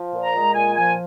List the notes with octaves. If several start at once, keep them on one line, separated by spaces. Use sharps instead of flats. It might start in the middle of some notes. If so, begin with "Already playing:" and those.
Already playing: F3
A#2
A#5
G#3
A#2 G#5
F3 G#5